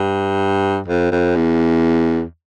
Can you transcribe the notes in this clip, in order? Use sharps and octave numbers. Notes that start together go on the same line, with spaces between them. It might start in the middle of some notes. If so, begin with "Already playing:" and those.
Already playing: G2
F2
F2
E2